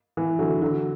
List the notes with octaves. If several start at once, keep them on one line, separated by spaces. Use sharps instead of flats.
E3
D3 F#3
D3 F#3